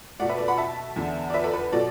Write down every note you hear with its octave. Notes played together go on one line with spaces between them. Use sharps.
B2 A3 D5 F#5
B4 E5
A4 D5
F#5 B5
E5 A5
E2 D3 B3
D5
B4 E5
A4 D5
B4
B2 F#3 A4 D5